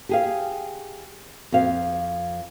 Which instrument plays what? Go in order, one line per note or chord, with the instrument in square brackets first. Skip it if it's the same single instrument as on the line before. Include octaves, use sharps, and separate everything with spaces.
[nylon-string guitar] G4 G#4 F5
F2 F5